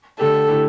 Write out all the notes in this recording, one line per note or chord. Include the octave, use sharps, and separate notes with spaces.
D3 A3 G4 A4
D3 A3 E4 G4